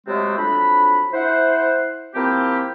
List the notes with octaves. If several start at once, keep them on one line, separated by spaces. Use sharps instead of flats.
C3 F#3 G#3 A3 B3 C4
F2 F#3 D4 B5
E4 C5 F#5
F3 A#3 C4 E4 G4